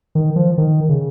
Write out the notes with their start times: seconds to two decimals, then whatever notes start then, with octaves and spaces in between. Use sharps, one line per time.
0.15 D#3
0.36 F3
0.58 D#3
0.89 C#3